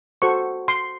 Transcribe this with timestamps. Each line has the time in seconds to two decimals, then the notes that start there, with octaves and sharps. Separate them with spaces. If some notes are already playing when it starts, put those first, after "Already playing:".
0.22 F#4 A4 C5 C#6
0.68 C6